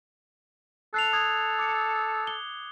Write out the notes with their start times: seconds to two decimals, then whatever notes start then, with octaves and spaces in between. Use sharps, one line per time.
0.94 A4 F#6 C7 F7
1.13 D#6 G#6
1.59 D6 C#7
2.27 G7